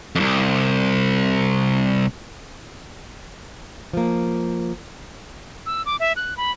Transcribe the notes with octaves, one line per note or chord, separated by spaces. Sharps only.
C2 F2
F3 A#3
E6
D6
E5
F#6
B5